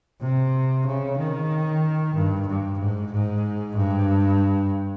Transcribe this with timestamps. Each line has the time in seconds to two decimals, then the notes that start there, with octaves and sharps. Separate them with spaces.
0.21 C3
0.86 C#3
1.18 D#3
2.15 G2
2.47 G2
2.79 G#2
3.12 G#2
3.76 G2